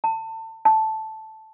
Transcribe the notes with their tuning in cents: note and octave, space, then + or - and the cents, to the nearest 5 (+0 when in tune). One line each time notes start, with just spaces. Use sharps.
A5 +30
A5 -5